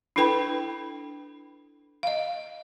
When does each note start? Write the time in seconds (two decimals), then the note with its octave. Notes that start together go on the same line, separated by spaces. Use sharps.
0.16 D4 E4 A4 B4 G5 B5
2.03 D#5 F5